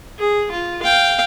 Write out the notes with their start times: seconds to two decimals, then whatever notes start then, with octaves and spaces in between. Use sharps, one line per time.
0.19 G#4
0.51 F4
0.82 F5 G5